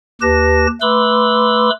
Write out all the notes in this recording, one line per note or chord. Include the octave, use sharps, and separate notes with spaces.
D#2 G4 B4 A5 A#6
A3 B4 B5 C6 D6 E6